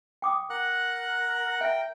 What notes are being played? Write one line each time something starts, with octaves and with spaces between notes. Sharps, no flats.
G5 D6 D#6
A#4 F#5 F#6
E5 G5